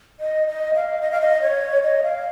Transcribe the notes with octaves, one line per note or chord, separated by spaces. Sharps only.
D#5
D#5
F5
D#5
F5
D#5
C#5
D#5
F5